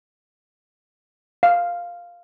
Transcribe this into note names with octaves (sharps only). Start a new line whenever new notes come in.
F5